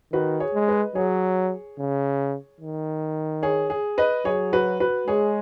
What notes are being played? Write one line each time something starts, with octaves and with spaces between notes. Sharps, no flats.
D#3 F#4 B4
G#4 C#5
G#3
B4 D#5
F#3 G#4 C#5
C#3
D#3
G#4 C#5
G#4
B4 D#5
F#3 G#4 C#5
F#4 B4
F#4 B4
G#3 G#4 C#5